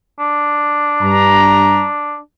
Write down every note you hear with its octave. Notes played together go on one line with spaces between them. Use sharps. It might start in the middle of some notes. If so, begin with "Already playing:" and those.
D4
G2 A#5